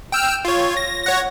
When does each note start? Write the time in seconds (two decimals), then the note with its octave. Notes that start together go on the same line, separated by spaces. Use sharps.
0.12 G5 E6 F6
0.45 F4 C#5
0.77 A#6
1.04 C#5 F#5 A#6